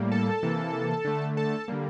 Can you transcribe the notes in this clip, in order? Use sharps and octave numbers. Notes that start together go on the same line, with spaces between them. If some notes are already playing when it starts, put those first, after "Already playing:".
Already playing: A2 G3 A#3
A4 A5
C3 E3 A#3
D3 A3
A4 A5
D3 G3 A#3